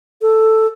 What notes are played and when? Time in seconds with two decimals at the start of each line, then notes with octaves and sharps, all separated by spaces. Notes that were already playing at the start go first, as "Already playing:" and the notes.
0.22 A4